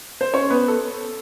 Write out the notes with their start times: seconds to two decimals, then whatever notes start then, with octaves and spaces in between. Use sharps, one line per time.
0.21 C5
0.34 C#4 C#5
0.50 B3 B4
0.68 A4